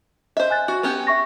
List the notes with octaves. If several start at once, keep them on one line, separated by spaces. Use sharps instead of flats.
C5 D#5 E5
G#5 F#6 A6
F#4
B3 C#4 G4
E5 C#6 A#6